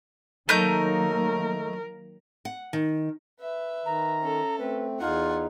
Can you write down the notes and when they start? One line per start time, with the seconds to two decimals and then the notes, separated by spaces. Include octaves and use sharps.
0.49 D#3 F#3 A3 A#3 D#4 A#4 G6
2.45 F#5
2.73 D#3
3.41 B4 E5
3.85 D#3 A#5
4.20 C#4 A4
4.58 A3 C4 B4
5.00 E2 D#4 F4 F#5 G#5